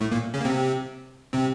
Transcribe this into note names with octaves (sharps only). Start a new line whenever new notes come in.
A2 A3
A#2 A#3
C#3 C#4
A#3
C3 C4
C3 C4